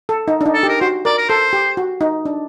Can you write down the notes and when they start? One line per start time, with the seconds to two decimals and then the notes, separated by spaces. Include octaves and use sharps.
0.09 A4
0.28 D#4
0.41 D4
0.46 D#4
0.54 A4
0.63 G4
0.68 A#4
0.81 F#4 C5
1.05 A#4 D5
1.18 A#4
1.29 A4 C5
1.53 G4
1.77 F#4
2.01 D#4
2.25 D4